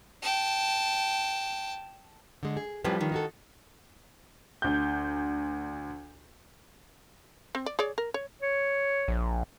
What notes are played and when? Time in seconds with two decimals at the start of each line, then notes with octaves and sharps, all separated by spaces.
0.22 G5 A5
2.43 D3 G#3
2.57 G#4
2.84 F#2 A2 F3 G3 C4 B4
3.01 D#3
3.12 D#4 F#4 A4
4.62 D2 G6
7.55 C4
7.66 D5
7.79 G#4 C#5 D5
7.98 A#4
8.14 C#5
8.42 C#5
9.08 A#1